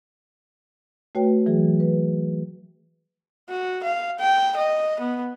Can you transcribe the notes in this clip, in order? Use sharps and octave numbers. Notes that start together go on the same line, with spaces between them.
A3 F#4 B4 C#5 G5
E3 F#3 G#4
B4
F#4
F5
G5
D#5
B3